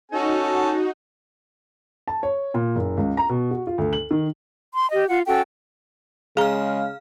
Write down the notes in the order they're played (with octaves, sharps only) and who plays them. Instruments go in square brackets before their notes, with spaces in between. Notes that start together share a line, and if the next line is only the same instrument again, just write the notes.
[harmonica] C#4 A4 A5 [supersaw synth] D#4 F#4
[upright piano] A5
C#5
A#2
F#1
C#2
A#5
B2
F#4
F4
D2
F#7
D#3
[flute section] C6
G4 D#5
F4 F#5
C#4 F#4 A4 G5
[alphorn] C#3 [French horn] G#3 [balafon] G#4 A#5 [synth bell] F5 F6